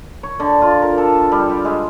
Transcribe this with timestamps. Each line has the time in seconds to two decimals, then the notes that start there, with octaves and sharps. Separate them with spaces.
0.23 C#5
0.40 D3
0.62 F4
0.82 A#4
0.98 A4
1.32 G3
1.50 G4
1.65 G#3